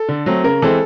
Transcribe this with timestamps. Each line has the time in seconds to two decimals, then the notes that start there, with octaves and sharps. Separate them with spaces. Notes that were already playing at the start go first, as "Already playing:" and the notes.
Already playing: A4
0.09 D3
0.26 F#3 A3 C4
0.44 C#3 A#4
0.62 E3 G#3 C4 A4